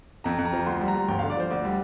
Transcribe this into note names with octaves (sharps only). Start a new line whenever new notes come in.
F2 A#5
F2
A#5
F3
D2 C6
G3
A#5
D2
G1 G5
D3 F5
D5
F3 C5
D2 D5
G3